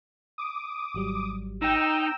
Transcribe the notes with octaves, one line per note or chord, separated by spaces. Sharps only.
D6 D#6
G#1 F#3 G3
D#4 G5 A#5 E6